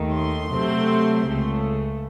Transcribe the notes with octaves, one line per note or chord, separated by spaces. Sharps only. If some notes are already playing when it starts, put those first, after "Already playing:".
Already playing: D#2 D#3 A3
C6
C3 F#3 A3 C4
C#2 C#3 A3